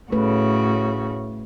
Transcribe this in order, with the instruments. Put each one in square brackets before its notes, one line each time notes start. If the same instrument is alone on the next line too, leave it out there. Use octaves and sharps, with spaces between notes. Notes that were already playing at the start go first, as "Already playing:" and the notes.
[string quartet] A2 C#3 F#4 [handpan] A3 B4